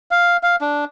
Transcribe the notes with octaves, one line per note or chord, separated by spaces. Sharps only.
F5
F5
D4